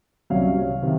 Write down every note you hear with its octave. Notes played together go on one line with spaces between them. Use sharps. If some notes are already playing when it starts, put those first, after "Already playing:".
C2 C3 F#3 C#4 F5
C3 D#3